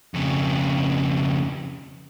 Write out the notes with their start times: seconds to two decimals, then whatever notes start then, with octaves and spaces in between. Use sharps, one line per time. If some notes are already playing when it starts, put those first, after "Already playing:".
0.14 F2 C#3